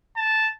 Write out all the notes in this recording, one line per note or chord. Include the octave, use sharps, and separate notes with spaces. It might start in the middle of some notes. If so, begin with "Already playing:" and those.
A5